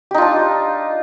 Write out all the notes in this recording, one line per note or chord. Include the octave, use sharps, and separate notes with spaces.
D4 D#4 F4 G4